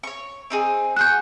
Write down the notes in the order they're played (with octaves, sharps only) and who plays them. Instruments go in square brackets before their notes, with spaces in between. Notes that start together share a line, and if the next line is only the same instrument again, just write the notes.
[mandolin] C#5 C#6
C4 D#4 G#4
[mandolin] F#4 G#4 C#6 [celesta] F#6 G6